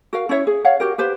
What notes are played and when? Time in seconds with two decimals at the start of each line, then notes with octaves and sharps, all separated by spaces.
0.13 F#4 A#4 F5
0.29 C#4 E4 C#5 E5
0.47 G#4
0.65 C#5 F5 F#5
0.80 F#4 G4 A#4
0.98 G4 B4 C5